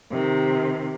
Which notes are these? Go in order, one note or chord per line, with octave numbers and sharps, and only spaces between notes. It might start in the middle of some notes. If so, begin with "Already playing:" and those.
C3 D#3